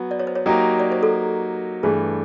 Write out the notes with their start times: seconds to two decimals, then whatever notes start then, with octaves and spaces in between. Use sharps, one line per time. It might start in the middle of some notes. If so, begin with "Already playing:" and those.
Already playing: F#3 B3
0.11 D5
0.19 C#5
0.27 C5
0.35 C#5
0.46 F#3 A#3 D#4 G4
0.80 D5
0.92 C5
1.03 A4
1.83 G2 E3 A3 G#4